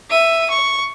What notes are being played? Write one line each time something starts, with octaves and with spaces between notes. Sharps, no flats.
E5 D#7
C#6